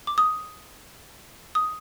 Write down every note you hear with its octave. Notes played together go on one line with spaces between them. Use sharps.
D6
D#6
D#6